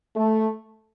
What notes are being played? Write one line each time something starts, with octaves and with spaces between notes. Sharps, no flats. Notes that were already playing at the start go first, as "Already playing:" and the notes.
A3